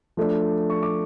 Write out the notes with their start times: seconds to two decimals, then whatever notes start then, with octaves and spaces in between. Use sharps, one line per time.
0.17 F3 A3 D4
0.70 C#6
0.83 D6